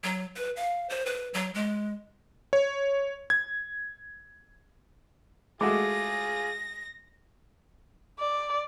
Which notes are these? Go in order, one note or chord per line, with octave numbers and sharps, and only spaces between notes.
F#3
B4
F5
C5
B4
F#3
G#3
C#5
G#6
G#3 A3 F4 F#4 G#4 D6 A#6
D5